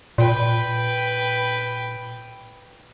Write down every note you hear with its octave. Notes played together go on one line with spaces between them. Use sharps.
A#2 B4 G5